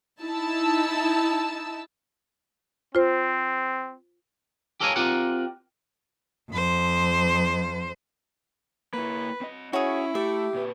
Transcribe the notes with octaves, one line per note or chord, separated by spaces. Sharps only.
D#4 E4 A5 E6
C4 F4 C5
G4 A4 A#4 C#5 F5 G#5
C4 F4 G4 A#4 D5 F#5
F2 C5
A#3 E4 B4
C4 D#5
C#4 E4 F#4 G#4 C#5
A3 G4 E5
A#2 B4